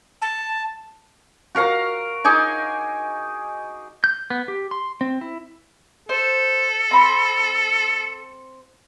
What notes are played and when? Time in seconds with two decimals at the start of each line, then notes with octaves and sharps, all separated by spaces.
0.22 A5
1.55 F#4 A#4 F5 A#5
2.24 D#4 G#4 G#5 D6
4.04 G6
4.30 B3
4.48 G4
4.71 C6
5.01 C4
5.21 E4
6.09 A4 C5
6.91 C4 B5 C6